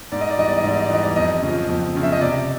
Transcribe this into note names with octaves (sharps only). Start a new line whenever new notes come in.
G#2 D5
D#5
D5
E3 G3 D#5
D5
D#5
G#2 D5
D#5
D5
E3 G3 D#5
D5
F2 D#5
C#3 F3
F2
C#3 F3
E5
D#5
C3 D5